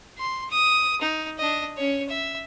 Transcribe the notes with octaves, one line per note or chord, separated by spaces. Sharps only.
C6
D#6
D#4
D4 D#5
C#4 C#5
E5